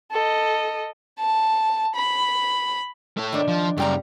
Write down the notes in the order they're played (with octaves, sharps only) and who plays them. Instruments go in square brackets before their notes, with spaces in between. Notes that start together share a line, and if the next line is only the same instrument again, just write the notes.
[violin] A4 D#5
[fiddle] A5
B5
[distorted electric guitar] A3 C#5
[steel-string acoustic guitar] D#3 D4
[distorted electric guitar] F3
[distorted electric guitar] F#2 C#3 [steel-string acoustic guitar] G3 G5 A#5